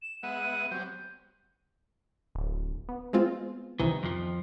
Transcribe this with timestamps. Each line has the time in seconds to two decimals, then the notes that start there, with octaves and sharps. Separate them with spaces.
0.02 E7
0.23 G#3 B3 E5 F#5 D#7
0.71 F#3 G3 C4 G6
2.35 D1
2.89 B3
3.13 G#3 C4 F4
3.80 C2 C3 D#3 E3
4.03 F2 F3